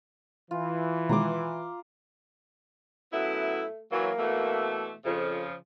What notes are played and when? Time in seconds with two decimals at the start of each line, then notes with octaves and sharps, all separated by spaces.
0.51 E3 F4
1.09 B2 D#3 G#3 A#5 C6 D6
3.13 F#2 A3 B3 E4
3.92 E3 F#3 A#3
4.19 B2 E3 A3
5.05 F2 C#3 F3